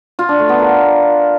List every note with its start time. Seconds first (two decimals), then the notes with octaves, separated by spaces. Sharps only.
0.19 F4
0.29 D4
0.39 A3
0.49 B3
0.59 A#4